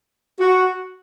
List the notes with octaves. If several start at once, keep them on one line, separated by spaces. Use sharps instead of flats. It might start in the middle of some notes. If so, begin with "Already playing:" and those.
F#4